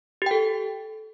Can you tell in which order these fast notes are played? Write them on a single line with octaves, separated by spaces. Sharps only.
G4 G5 A4